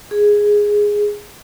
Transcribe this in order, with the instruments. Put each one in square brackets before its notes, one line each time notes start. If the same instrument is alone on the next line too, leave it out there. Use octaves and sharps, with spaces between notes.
[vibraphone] G#4